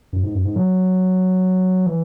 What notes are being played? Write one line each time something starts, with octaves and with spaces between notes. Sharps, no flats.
F#2
G#2
F#2
G#2
F#3
E3